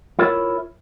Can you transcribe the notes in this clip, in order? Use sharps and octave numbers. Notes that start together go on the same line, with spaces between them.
E4 F4 A#4 C#5 E5